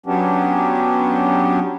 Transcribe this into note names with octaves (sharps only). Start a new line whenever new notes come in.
F#3 B3 C#4 D4 G4